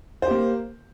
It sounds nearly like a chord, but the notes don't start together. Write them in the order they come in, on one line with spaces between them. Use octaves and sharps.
C5 G4 A#3